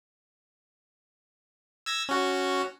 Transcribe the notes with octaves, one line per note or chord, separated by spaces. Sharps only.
E6 G#6 A#6
C#4 F#4